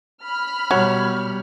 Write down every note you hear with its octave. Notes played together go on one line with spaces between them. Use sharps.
B5 F6
B2 F#3 G3 C#5